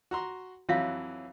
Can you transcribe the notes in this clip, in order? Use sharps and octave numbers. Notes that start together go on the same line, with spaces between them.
F#4 A#5 C6
F2 E3 F#3 C#5 E5 F5